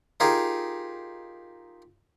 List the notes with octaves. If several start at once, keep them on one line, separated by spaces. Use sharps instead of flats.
D#4 F4 G4 G#4 A#4